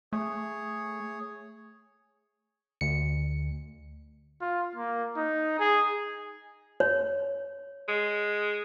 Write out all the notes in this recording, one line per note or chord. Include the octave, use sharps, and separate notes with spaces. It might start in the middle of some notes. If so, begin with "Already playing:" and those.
A3 G#4 C#5
D2 C#7
F4
A#3
D#4
G#4
C#5
G#3